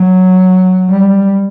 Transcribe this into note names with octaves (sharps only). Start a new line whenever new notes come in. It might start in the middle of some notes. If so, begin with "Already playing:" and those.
Already playing: F#3
G3